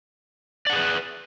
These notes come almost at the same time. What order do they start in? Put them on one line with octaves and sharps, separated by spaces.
D5 F#5 G#4 B4